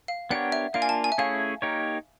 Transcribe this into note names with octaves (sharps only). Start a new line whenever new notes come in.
F5
B3 D4 G4 A#4 C#5 F#5
E5
A#3 D4 F4 A#4 F5
G#5
A5
G#5
E5
A3 C#4 E4 G#4 C#5 F5
A#3 D#4 G4 A#4 C#5